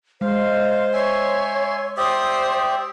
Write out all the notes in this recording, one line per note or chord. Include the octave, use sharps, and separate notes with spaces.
G#3 C5 F5
C#5 E5 G#5 C6
G4 C5 D5 E5 D#6